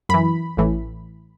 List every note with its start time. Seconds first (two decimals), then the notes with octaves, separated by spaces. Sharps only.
0.09 F#2 E3 B5
0.57 A1 A2 E3